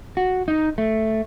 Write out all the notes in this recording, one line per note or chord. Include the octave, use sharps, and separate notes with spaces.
F#4
D#4
A3